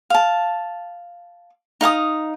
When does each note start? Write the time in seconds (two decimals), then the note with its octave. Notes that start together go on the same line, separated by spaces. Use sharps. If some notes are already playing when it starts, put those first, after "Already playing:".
0.10 F5 A5
1.81 D#4 F5 G#5 D#6